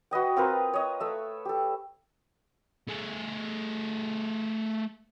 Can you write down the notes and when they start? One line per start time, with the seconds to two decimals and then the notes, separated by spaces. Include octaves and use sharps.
0.11 F#4 B4 D#5 G5
0.36 C4 F4 A#4 B4
0.73 C#5 D#5
1.00 A3 E5
1.45 G4 A4
2.88 A3 G#4